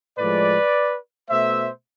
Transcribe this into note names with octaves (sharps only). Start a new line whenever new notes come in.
A2 F3 G#3 B4 D5
B2 A3 C5 E5